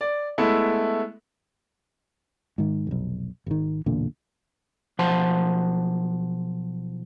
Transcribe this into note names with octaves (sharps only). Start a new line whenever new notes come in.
D5
G#3 A3 B3 E4
G#2 D#3
F1 B1
G#1 D#3
B1 E2 A#2 D3
B1 F3 C5 F#5 A5 C6